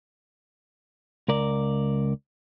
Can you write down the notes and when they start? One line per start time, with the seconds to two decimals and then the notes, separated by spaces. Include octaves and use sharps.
1.28 C#2 A#4 D5